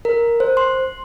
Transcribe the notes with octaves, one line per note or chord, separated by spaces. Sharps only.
A#4
C5
C6